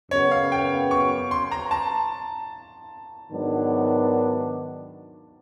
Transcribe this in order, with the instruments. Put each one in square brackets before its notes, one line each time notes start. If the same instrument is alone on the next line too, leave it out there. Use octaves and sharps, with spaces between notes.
[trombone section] F#2 C#3 F#3 B3 [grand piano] C#5
[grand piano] F5
G5
C#6
C6
A#5
A5
[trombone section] G#2 D#3 F#3 B3 D4